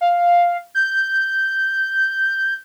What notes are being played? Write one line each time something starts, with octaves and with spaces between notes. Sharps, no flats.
F5
G6